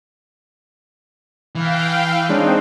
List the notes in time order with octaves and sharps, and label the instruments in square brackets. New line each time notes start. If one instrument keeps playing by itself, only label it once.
[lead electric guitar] E3 [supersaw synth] F5 G5
[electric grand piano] G#3 D4 C#5 [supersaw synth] C4 D#4